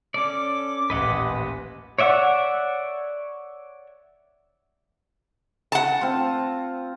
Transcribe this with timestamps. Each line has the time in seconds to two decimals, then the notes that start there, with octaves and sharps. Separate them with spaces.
0.14 C#4 A4 D5 D6
0.90 D#1 A1 B4 D#5 F#5
1.99 C#5 D5 E5 F#5
5.72 F#5 A5
6.01 C4 F4